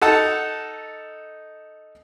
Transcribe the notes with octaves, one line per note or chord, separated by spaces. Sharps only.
D#4 A4 F#5 A5